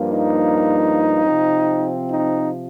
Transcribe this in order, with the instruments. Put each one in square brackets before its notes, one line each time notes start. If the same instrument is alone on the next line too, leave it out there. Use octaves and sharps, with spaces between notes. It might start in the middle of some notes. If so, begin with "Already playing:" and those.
Already playing: [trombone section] G2 F3 A#3
D#4
C3 F3 C4
D#4